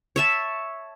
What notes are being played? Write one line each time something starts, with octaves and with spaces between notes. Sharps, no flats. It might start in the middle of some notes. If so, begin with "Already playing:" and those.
C#5 E5 A5